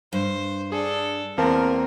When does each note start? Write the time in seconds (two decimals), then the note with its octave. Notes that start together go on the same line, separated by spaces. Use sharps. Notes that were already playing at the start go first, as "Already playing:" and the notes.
0.13 G2 C5
0.72 D4 G#4 A4
1.38 E2 A#3 C4 A#4 A5